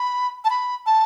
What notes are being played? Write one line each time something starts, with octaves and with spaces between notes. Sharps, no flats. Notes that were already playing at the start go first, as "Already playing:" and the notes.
Already playing: B5
A5
B5
A5